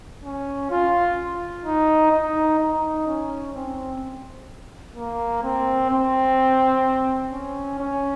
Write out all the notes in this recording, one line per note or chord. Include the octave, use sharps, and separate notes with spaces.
C#4
F4
D#4
D#4
D#4
C#4
C4
A#3
C4
C4
C#4
C#4